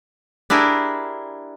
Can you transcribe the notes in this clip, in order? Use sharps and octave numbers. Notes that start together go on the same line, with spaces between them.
D4 E4 G4 G#4 A#4